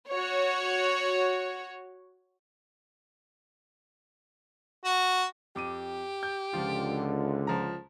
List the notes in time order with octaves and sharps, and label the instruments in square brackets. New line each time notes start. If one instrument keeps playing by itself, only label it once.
[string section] F#4 C#5
[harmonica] F#4
[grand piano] F2 D6 D#7 [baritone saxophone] G4
[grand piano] G6
[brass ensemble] C#2 D3 [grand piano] F3 F4
[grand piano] F3 A#5